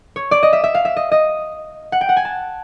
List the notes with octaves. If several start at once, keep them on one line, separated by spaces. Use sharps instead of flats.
C#5
D5
D#5
E5
E5
F5
E5
D#5
D#5
F#5
G5
F#5
G#5
A5